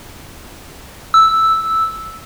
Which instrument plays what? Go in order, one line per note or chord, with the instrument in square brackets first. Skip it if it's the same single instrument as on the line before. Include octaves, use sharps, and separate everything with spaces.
[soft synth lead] E6